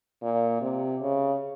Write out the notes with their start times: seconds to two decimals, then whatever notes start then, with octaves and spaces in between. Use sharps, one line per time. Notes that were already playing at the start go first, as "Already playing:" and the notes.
0.23 A#2
0.61 C3
1.01 C#3